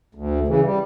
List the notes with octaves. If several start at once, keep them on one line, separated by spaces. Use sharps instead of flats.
D2
C#3 E3
G3